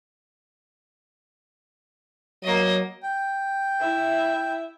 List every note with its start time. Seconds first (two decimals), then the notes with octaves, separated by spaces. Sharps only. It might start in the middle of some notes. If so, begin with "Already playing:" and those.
2.43 F#3 A#3 D#5
3.03 G5
3.80 E4 E5